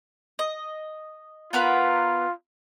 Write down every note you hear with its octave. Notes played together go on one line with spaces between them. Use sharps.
D#5
B3 F4 A#4 B4